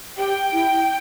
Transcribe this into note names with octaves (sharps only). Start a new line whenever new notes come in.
G4 G5
E4